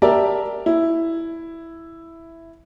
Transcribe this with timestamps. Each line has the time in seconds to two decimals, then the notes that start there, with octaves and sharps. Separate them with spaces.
0.02 G4 A#4 D5 E5 A5 A#5
0.66 E4